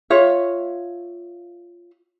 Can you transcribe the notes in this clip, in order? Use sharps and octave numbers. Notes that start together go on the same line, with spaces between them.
F4 C#5 E5